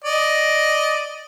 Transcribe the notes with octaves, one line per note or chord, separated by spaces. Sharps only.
D5 D#5